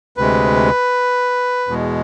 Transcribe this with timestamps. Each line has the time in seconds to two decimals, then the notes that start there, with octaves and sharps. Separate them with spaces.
0.17 D2 C3 G#3 B4
1.68 E2 B2 G#3